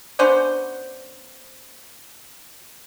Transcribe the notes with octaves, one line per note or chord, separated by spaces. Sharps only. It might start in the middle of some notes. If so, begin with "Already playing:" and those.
B3 C#4 D4 C5